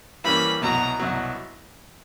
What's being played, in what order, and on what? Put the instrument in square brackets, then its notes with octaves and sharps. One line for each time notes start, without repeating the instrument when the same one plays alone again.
[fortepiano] E3 G3 A#3 C#4 [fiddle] B5
[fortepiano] C2 B2 F#3 [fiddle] A#5
[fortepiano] C2 B2 F#3